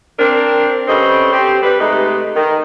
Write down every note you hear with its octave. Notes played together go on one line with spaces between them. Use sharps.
C4 D4 A#4
D3 G3 C4 C#4 B4 D#5
C4 G4
G3 B4
C3 G#3 A3 D#4 B4 D#5
D#3